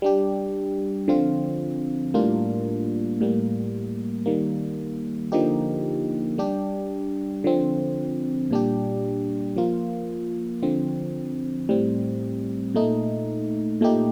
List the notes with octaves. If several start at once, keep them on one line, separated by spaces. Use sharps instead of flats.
G3 D4 G4
D3 F3 C4 F4
A2 G3 A#3 D4 F4
A2 G3 A#3
D#3 G3 A#3
D3 F3 A#3 D#4 G4
G3 D4 G4
D3 F3 C4
A#2 G3 D4 G4
F3 A#3 F4
D3 F3 C4
A2 G3 C4
A#2 A3 D#4
A#2 A3 D#4 G4